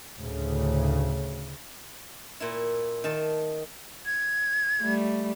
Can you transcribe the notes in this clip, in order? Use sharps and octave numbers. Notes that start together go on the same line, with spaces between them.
D2 A2 C#3
A#2 E4
D#3 A5
G#6
G3 A3